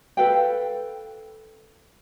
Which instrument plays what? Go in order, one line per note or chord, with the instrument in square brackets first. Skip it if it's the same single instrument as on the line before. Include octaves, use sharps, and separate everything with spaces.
[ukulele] A4 B4 F5 G5